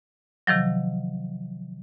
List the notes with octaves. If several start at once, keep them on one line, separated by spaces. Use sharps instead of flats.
C3 D#3 F3 F#3